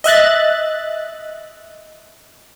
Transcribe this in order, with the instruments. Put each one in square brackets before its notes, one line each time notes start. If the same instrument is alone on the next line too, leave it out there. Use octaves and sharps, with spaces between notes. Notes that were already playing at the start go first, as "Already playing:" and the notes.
[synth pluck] D#5 E5 F#6 A6